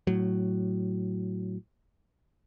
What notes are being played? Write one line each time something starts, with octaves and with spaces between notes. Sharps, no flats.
A2 F#3